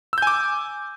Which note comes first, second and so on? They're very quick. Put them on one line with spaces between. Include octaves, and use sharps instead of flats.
E6 G6 G#5 D6